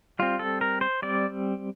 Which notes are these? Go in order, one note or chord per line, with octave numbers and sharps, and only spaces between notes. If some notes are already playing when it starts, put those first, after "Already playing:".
G3 C4 F4
A4
A#4
C5
G3 C4 D5